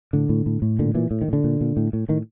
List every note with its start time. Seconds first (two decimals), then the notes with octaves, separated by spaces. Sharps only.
0.13 A2 D3
0.29 A2
0.46 A2
0.62 A2
0.79 A#2 D3
0.95 A#2 E3
1.11 A2
1.22 D#3
1.28 A2 D3
1.44 A#2
1.61 A#2
1.77 A2
1.93 A2
2.09 A2 D#3